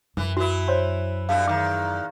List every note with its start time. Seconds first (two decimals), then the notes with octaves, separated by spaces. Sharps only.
0.17 F#2 E3
0.37 E3 E4 F#4 A#4
0.68 C5 C#5 C6
1.29 G2 B2 A3 F5
1.48 E2 A2 D#3 D6